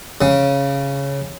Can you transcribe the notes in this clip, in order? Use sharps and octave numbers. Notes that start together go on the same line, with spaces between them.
C#3